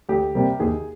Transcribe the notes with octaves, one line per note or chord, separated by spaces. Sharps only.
D2 G4
C3 G3 A#3
D#2 G#4